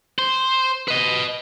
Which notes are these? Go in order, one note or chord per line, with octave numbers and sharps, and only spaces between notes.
C5
B4 D#5